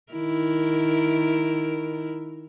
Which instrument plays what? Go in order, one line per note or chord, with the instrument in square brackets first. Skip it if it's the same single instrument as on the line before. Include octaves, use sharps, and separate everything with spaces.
[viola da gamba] D#3 E4 A#4